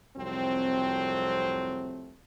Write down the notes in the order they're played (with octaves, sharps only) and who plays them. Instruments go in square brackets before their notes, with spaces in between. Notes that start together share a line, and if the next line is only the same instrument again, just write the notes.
[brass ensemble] C2 F2 F#3 A3 C4